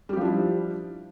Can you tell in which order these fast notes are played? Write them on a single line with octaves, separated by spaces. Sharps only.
G3 G4 F3 D4 E4